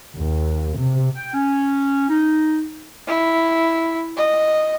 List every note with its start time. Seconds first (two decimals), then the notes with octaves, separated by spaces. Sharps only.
0.17 D#2
0.78 C3
1.16 G5
1.34 C#4
2.09 D#4
3.08 E4
4.17 D#5